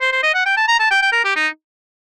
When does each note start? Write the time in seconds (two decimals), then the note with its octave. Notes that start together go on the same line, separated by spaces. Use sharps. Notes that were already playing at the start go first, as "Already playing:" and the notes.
0.01 C5
0.12 C5
0.23 D#5
0.34 F#5
0.46 G5
0.57 A5
0.68 A#5
0.79 A5
0.91 G5
1.02 G5
1.12 A#4
1.25 G4
1.36 D#4